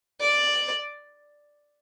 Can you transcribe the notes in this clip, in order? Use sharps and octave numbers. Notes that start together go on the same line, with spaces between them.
D5